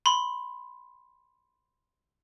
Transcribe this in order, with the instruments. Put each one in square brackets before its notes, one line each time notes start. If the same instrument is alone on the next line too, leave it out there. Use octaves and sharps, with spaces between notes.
[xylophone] B5 C6